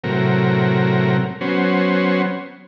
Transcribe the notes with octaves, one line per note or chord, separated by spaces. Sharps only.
A2 C3 F#3 A#4
F#3 B3 C#4 C5